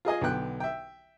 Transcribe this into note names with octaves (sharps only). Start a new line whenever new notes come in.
F4 G#4 D#5 G#5
B1 D3 B3 G5 F#6
E5 G5